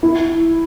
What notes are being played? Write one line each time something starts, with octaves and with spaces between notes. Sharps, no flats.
E4